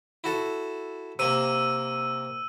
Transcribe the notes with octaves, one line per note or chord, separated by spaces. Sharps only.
E4 F#4 A4
C3 A#3 E6 D#7